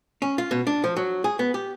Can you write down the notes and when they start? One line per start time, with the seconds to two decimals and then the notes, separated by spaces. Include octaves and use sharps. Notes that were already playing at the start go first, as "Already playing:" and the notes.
0.22 C#4
0.38 F4
0.51 B2
0.67 D4
0.84 F3
0.97 F#3
1.24 G#4
1.39 B3
1.54 G4